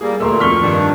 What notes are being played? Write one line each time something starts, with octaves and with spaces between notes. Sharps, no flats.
G3 A#3 G#4
D2 A#2 A3 A#4 C6 E6
F2 C#6 F6 B6 G7
G2 D#3 D4